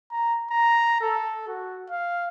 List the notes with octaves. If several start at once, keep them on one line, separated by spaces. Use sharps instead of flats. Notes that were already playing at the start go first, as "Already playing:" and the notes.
A#5
A#5
A4
F#4
F5